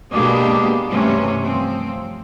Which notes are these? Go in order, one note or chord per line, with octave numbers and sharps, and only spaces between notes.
B2 G#3 A#3 D4 G4 G#4
G2 C3 E3 A3 C#4
F3 C4